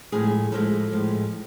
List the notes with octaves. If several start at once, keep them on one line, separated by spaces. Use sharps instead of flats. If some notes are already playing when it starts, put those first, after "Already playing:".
A2 F3 G#3 G#4
A2 F3 G#3 A4
A2 F3 G#3